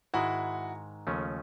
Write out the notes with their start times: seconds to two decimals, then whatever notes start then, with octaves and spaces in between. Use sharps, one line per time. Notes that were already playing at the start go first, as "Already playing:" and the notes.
0.14 G#2 D#3 G#3 E4 F#4
1.07 D#2 C#3 F3 A3 C#4